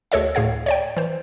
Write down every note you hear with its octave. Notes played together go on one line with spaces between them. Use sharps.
D2 G#4 A4 C#5 D#5 E5
D2 A2 G#4 F5 G#6
C#5 D5 G5
E3 C5